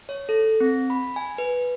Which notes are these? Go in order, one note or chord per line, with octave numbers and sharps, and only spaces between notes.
C#5
A4
C4
B5
G#5
B4